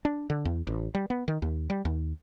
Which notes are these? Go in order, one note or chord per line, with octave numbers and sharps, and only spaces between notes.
D4
D3
E2
A1
G3
B3
D#3
D#2
G3
D#2